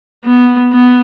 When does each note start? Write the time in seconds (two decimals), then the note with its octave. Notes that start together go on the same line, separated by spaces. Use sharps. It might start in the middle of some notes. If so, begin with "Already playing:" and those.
0.25 B3
0.73 B3